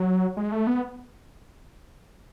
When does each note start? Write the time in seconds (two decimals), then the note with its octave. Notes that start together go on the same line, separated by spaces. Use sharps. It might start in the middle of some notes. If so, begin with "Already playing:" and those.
Already playing: F#3
0.37 G#3
0.52 A3
0.67 B3